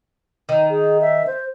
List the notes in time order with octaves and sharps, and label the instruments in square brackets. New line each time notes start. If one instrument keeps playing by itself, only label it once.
[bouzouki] D#3
[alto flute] G#4
E5
C5